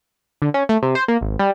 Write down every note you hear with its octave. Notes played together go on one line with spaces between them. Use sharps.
D3
C#4
A3
C3
C5
A#3
G#1
G3